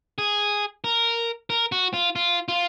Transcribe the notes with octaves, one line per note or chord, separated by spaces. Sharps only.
G#4
A#4
A#4
F#4
F4
F4
F4